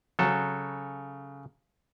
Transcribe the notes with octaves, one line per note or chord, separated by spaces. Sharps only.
C#3 F#3 A4